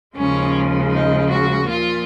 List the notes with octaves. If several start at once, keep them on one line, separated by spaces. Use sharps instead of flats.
D#2 C#3 F3 G#3 C#4
D#4
F#4
A#2 F3 A#3 F4